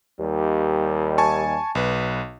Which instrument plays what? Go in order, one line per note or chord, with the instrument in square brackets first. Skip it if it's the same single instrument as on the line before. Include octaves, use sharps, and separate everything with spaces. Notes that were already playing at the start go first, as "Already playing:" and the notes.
[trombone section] D#2 G3
[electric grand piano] G#5 A5 C#6
B1 B4